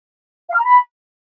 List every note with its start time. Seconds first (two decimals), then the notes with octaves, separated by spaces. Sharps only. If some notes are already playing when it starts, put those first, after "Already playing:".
0.47 F5
0.52 F6
0.57 A#5
0.63 B5